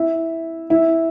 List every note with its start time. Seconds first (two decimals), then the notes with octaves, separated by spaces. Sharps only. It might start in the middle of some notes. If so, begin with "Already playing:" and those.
Already playing: E4
0.70 E4